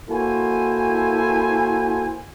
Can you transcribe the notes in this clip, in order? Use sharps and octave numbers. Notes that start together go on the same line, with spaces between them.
A#3 E4 F#4 A4 C5 G#5